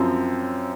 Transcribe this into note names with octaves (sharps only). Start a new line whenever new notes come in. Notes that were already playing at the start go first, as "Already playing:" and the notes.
Already playing: F#2 F3 C4